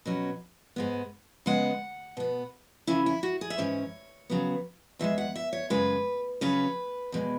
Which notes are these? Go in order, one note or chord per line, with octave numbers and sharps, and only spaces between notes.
B2 F#3 C#4
G#2 G#3 B3
C#3 G#3 B3 F#5
B2 B3
C#3 E3 C#4 E4
E4
F#4
G#4
E5
G#2 E3 C#4 C#5
C#3 F#3 B3
E2 E3 G#3 E5
F#5
E5
C#5
F#2 C#3 G#3 B4
C#3 F#3 C#4 B4
E2 B2 G#3